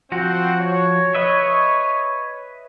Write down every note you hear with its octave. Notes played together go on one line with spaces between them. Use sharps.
F3 C4 F#4 C5 F#5
C#5
B4 D#5 E5